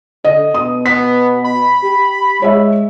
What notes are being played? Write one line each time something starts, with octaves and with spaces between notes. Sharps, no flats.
D3 D#5
B2 D#6
B3 B6
B5
G4
G#3 C#5 E5